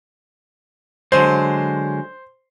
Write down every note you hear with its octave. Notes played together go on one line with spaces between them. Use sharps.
D3 F#3 G#3 C5